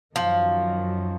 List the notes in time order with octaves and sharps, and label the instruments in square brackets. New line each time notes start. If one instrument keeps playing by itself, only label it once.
[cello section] F#2 D#3 F#3 [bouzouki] F3